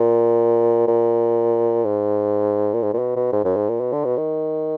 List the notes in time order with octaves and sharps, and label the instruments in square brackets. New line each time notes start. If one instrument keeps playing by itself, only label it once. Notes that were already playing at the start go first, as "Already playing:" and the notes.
Already playing: [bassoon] A#2
A#2
G#2
A#2
G#2
A#2
B2
B2
G#2
F#2
G#2
A#2
B2
D3
B2
D#3